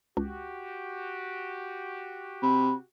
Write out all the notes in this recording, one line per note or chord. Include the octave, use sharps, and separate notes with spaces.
C#2 F#4 G4
C3 B5